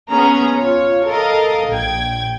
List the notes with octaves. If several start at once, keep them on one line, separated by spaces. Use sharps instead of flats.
B3 C#4 G#4 A#5
F4 C#5
A4 A#4 D#5 F5
A#1 G5 G#6